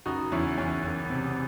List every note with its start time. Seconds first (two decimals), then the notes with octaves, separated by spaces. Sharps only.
0.06 F#1 D#4 F#4
0.31 E2 C#4 E4
0.58 E2 C#4
0.83 F#1
1.10 C3